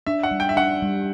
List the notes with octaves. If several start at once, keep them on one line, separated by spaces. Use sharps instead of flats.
D4 E5
F#5
G3
G5
E5
D4 F#5
G3